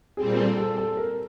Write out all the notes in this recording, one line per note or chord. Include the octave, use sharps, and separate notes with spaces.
A#2 G3 C4 G#4
A4
A4
A4
A#4